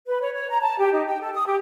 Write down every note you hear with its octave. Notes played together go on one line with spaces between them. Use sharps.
B4
C#5
C#5
A#5
A5
G4
D#4
G5
A4
D#6
G4